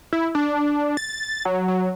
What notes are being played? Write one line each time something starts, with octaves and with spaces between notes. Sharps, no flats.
E4
D4
A6
F#3
F#3